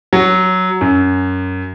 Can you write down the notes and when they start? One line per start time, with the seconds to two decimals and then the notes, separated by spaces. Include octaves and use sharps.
0.13 F#3
0.81 F#2